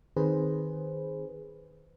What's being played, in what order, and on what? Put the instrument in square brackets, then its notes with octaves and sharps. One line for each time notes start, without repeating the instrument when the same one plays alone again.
[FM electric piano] D#3 C4 G#4 B4 C5